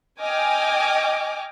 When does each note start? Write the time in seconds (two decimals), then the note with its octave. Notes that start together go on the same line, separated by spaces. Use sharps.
0.22 D#5 G5 G#5 D6 F6